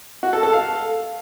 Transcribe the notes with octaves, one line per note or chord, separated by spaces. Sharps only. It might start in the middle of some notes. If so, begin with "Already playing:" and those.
F#4
A4
A4
F5